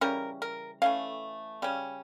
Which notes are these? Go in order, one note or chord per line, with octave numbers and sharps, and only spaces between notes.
C#3 E3 G3 C#4 A#4
A#4
E3 A3 C#4 F5
C#3 G3 C#4